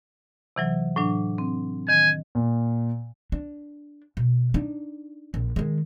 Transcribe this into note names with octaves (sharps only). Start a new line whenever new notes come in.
C3 E3 F#3
A2 F#3 D4
C4
D#3 G#5
A#2
D4
B2
D4 D#4
A#1
D#3 G#3